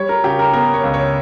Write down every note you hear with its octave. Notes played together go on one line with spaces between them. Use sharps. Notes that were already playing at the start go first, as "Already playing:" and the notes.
Already playing: G3 C#5
A#4
C#3 G4
A#4
B3 A#4
C#5
C#2
C#5